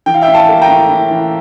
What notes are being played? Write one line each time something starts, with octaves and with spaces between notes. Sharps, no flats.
E3 G5
F5
E5 G5
A2
F5 A5
A#3
G5 A#5
A2
A2
E3